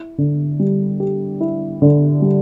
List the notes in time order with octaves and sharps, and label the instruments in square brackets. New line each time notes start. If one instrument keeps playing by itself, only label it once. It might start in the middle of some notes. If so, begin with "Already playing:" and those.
Already playing: [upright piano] E4
D3
G3
G4
E4
D3
G3